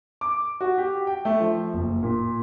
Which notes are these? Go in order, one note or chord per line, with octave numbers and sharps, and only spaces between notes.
D6
F#4
G4
G5
A3
F3
F#1
A#2